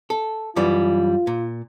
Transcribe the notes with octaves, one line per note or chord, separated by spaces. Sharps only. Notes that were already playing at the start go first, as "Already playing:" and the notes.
A4
F#2 E3 G3 F4
A#2